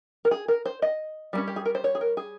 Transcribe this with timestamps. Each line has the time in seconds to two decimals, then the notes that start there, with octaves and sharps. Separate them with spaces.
0.25 A#4
0.31 G#4
0.48 A#4
0.65 C5
0.82 D#5
1.33 G3 A#3 C#4
1.48 G4
1.56 G#4
1.66 A#4
1.75 C5
1.84 C#5
1.95 G#4
2.01 A#4
2.17 G#4